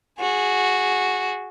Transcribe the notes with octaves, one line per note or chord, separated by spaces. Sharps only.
F#4 G#4